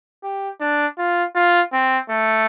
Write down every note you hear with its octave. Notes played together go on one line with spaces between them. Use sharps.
G4
D4
F4
F4
C4
A3